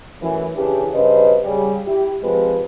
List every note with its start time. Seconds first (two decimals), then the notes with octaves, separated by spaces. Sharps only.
0.21 F#2 A2 E3
0.55 C#3 E3 D4 G4 B4
0.93 G2 C#3 B4 C5 D#5
1.43 C#3 G3
1.85 E4 G4
2.22 F3 G#3 C4 G4 B4